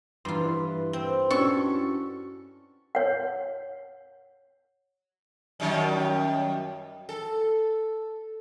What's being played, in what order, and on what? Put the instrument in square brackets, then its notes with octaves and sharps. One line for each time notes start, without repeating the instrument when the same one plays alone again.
[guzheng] G2 F4 [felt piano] E3 [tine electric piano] A#5 C6
[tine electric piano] E4 B4
[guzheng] C4
[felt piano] C#4 D4 F#4 [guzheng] A4 [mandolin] C#6
[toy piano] C#5 F#5
[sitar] F#2 D#3 G3
A4